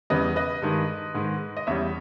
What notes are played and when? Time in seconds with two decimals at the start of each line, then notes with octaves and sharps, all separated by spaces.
0.10 E2 C#3 G3 B4 D#5
0.36 B4 D#5
0.62 G2 D#3 G#3
1.14 G#2 D#3 G#3
1.57 D#5
1.67 E2 C#3 G3 C#5 E5